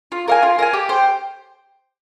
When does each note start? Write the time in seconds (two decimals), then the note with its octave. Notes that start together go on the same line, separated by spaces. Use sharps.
0.12 F4
0.28 A#4 F5 G#5
0.43 F4
0.59 A#4 F5 G#5
0.73 G4
0.89 C5 G5